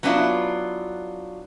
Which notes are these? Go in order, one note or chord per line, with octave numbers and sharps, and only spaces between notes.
F#3 B3 C#4 D4 E4 F4